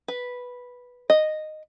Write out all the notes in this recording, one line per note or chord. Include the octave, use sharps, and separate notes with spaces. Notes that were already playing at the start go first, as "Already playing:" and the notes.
B4
D#5